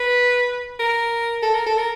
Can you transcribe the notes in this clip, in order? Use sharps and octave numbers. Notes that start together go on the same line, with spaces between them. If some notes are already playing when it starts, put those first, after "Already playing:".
Already playing: B4
A#4
A4
A#4
A4
A#4